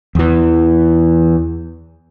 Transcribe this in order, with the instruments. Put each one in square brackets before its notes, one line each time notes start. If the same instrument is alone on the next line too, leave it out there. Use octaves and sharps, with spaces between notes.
[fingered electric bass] E2 E3